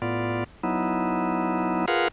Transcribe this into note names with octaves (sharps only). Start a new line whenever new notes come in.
A2 B3 F4 D5
F#3 B3 D#4 E4
F4 G#4 A#4 B4 F5 F#5